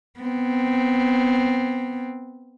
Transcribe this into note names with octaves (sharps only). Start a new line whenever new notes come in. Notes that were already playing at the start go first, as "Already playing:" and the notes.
B3 C4